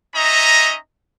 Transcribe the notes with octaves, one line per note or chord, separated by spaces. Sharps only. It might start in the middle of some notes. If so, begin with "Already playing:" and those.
C#4 D#4 D#5 E5 A#5